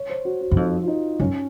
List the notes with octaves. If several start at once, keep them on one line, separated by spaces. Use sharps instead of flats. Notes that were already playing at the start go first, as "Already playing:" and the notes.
Already playing: C#5
C5
F#4
F#4
F#2
F2 D#4
F4
D#4
F#2 C#4